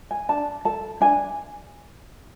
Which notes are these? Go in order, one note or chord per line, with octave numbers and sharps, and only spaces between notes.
G#5
D4 A5
A4 A5
D4 G#5